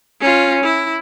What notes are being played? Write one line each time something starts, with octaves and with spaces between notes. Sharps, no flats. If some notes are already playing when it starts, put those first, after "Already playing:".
C#4 F4
E4